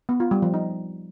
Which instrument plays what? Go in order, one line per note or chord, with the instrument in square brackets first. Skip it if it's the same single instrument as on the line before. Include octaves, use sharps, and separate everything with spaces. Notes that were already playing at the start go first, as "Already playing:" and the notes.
[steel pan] B3
F4
G3
F3
D#4